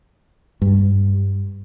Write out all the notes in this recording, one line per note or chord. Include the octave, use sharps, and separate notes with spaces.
G2